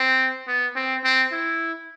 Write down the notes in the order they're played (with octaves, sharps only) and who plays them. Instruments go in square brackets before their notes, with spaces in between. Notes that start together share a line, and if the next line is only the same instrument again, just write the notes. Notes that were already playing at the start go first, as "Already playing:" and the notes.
Already playing: [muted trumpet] C4
B3
C4
C4
E4